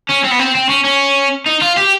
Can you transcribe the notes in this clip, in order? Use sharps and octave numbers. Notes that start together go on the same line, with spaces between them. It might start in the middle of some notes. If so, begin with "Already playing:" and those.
C#4
C4
B3
C4
C4
C#4
C#4
D#4
F4
G4